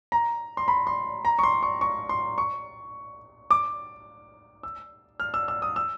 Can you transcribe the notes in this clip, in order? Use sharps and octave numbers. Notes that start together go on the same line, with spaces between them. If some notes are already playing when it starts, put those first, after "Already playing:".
A#5
C6
B5
C6
A#5
C#6
C6
C#6
C#6
C6
C#6
D6
E6
F6
E6
E6
D#6
E6